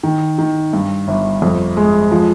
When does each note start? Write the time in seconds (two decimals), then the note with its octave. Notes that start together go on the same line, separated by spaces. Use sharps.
0.03 D#3
0.39 D#3
0.73 G2
1.08 G1
1.42 F2
1.77 G#3
2.11 F3